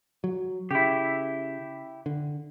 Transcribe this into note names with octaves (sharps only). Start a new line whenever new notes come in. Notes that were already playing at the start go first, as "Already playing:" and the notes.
F#3
C#3 E4 G4
D3